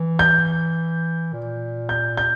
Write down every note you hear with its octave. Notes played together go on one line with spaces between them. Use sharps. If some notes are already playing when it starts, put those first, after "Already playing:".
Already playing: E3
G6
A#2
G6
G6